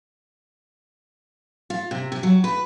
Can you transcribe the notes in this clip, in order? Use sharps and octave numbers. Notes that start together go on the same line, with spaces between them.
F4
C3
C3
F#3
B4